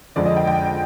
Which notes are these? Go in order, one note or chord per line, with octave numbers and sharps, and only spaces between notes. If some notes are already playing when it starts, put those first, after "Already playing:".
F2 D3 G#3 D5
D#5
G5
G5